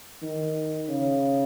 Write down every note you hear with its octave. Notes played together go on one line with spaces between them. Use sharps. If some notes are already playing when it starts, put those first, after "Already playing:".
D#3
C#3